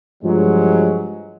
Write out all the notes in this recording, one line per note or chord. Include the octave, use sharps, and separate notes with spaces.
G2 F3 F#3 G#3